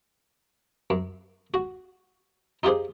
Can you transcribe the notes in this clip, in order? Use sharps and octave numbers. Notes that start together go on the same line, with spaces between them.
F#2
F#4
D#4 F4 G4 G#4 C5